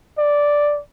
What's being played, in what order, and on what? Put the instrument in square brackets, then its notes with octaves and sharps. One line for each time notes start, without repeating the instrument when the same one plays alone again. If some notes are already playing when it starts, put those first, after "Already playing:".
[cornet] D5